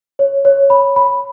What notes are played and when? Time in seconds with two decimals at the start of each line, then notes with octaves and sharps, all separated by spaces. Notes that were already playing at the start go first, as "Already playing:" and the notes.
0.19 C#5
0.45 C#5
0.70 B5
0.96 B5